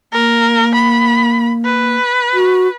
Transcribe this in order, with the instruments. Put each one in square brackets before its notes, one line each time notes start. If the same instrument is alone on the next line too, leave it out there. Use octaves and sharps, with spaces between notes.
[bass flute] A#3 [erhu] A#4
[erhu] B5
B4
[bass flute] F#4